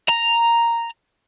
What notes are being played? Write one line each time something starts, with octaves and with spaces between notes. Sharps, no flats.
A#5